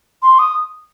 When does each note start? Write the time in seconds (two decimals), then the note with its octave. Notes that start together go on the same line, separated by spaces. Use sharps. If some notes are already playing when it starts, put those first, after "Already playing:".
0.22 C6
0.39 D#6